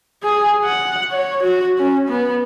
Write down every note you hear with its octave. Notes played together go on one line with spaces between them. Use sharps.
G#4
F#5
C#5
F#4
C#4
B3